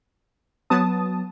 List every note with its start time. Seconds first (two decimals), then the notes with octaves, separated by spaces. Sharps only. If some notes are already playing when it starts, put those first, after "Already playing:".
0.70 F#3 B3 A5 D#6